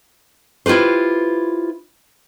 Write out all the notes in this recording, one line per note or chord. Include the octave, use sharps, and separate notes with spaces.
E4 F4 G4 B4 C5